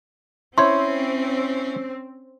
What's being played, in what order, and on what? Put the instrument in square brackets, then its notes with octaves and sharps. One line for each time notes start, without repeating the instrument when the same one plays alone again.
[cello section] C4 [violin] C#4 [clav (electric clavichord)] E4 C5 C#5 [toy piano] C6